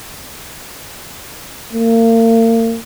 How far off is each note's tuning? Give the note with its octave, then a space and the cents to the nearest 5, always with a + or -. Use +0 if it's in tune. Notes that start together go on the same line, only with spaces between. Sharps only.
A#3 -40